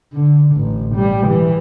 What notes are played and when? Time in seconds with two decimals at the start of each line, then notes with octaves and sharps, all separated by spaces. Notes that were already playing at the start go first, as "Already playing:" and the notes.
0.13 D3
0.56 A1
0.95 G3
1.27 E3